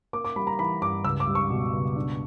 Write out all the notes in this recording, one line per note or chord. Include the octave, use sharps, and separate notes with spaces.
A#3 D6
D6
G3 B5
A#5
E3 B5
G2 D6
C#2 E6
D6
G3
C#6
B2
C#2
D4